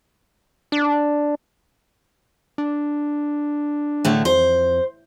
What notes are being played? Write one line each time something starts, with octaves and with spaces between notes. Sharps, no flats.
D4
D4
A2 D3 A3
F2 C5